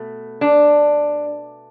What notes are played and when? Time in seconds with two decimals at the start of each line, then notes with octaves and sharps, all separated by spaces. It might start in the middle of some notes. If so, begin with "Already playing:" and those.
Already playing: B2 A3
0.41 D4